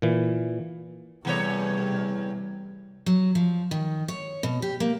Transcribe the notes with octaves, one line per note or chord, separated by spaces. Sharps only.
A#2 E3
E2 C3 G3 A3 C#5
F#3
F3
D#3
C#5
B2
G4
A#3